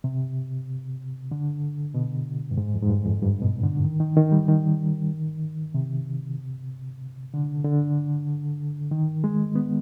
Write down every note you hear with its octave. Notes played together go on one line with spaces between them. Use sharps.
C3
D3
B2
G2
G#2
F2
G#2
G2
F2
G2
B2
D3
D#3
D#3
D#3
G3
D#3
C3
D3
D3
D#3
G#3
B3